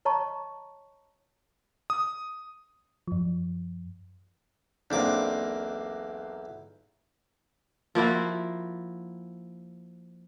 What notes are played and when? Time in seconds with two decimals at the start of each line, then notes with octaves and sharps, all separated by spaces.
0.05 C#5 D#5 A5 A#5 C#6
1.90 D#6
3.07 F#2 F3
4.90 B1 E2 A#3 C4 D4 D6
7.95 F3 A#3 E4 F#4